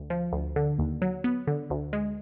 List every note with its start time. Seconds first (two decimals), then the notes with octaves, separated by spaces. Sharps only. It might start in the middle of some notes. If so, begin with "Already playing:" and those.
Already playing: D2
0.10 F3
0.33 D2
0.56 D3
0.79 D#2
1.02 F#3
1.24 B3
1.47 D3
1.70 D2
1.93 G#3